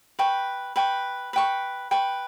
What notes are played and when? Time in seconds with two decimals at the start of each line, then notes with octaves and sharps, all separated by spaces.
0.19 B4 G5 C#6
0.76 B4 G5 C#6
1.33 B4 G5 C#6
1.91 B4 G5 C#6